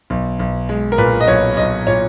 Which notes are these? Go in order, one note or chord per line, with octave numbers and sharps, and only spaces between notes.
B1
B1
G#3
A#4
A#2 B4
D#5
B1 C#5
B1 D#5
A#2 C#5